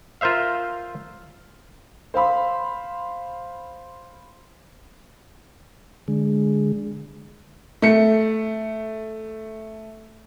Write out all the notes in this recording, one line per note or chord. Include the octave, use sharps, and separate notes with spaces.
F4 A#4 C5 E5 F5
C5 F5 B5 C6
D3 G#3
A3 C#7